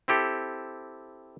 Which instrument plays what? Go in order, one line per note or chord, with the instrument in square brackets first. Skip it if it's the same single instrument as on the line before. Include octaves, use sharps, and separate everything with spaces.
[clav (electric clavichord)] C4 E4 G4 A4